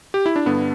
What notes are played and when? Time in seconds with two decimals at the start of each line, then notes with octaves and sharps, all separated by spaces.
0.14 G4
0.26 E4
0.36 D4
0.46 G2 D3 B3